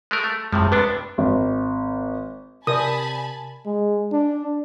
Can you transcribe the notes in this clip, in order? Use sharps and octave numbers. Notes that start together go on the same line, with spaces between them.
G#3 A3 A#4
A3
F#2 A2 C3 F3 G#3
C3 B3 D4 B4
G#1
C3 A#4 C#5 D5 G#5 A5 B5 D#6
G#3
D4